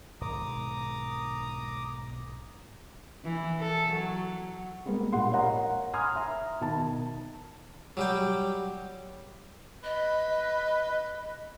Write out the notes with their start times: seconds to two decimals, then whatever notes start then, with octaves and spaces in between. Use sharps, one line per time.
0.21 B1 G#2 D#3 A#5 D6 D#6
3.24 E3
3.60 A4
3.92 F#3
4.85 G3 G#3 A#3 B3
5.13 A#1 G4 F#5 C6
5.31 A#4 C#5 D#5 F5 F#5 A#5
5.93 G#5 A#5 C6 D#6 F6 G#6
6.16 E5 A#5
6.60 B2 D#3 A5
7.97 F#3 G3 G5
9.83 B4 D#5